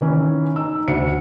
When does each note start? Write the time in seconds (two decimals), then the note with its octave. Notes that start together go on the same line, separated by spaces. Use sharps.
0.01 D#3 E3 C#4
0.56 D#4 E6
0.88 D2 C#7